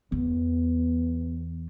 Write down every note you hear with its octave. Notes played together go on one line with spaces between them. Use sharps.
E2 B3